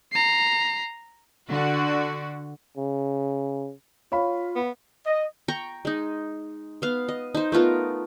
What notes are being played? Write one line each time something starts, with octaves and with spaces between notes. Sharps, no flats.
A#5 C7
D3 F#4
C#3
F4 C#5 F5 B5
B3
D#5
G5 A#5 C#6
G#3 D#4
B3 F5
D#5
D#4 C5
A3 B3 F4 A#4